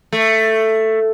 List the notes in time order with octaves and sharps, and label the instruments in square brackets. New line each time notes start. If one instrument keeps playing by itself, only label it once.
[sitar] A3